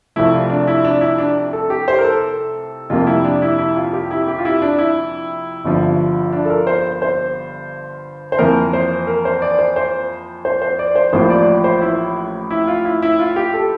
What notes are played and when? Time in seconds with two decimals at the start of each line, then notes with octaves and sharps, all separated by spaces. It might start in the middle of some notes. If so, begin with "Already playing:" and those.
0.16 C2 C3 F3 A3 E4
0.33 F4
0.50 D4
0.67 E4
0.85 D4
1.01 E4
1.18 D4
1.53 A4
1.70 G4
1.88 C5
1.99 A#4
2.04 A4
2.90 F2 C3 G3 A#3 F4
3.07 E4
3.25 D4
3.42 E4
3.58 E4
3.76 F4
3.93 G4
4.11 E4
4.28 G4
4.38 F4
4.45 E4
4.62 D4
4.78 E4
5.65 G1 G2 F3
6.33 D4
6.45 A4
6.50 A#4
6.67 C5
7.02 C5
8.32 C5
8.39 F2 E3 A#3 A#4
8.73 C5
9.07 A#4
9.25 C5
9.42 D5
9.59 C5
9.76 C5
10.45 C5
10.62 C5
10.79 D5
10.96 C5
11.13 A1 A2 F3 A#3 C5
11.30 D5
11.64 C5
11.81 E4
12.50 E4
12.68 F4
12.85 E4
13.02 E4
13.19 F4
13.36 G4
13.54 A4